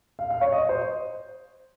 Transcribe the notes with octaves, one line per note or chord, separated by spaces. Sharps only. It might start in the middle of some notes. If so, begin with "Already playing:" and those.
F5
F5
C#5
D#5
C5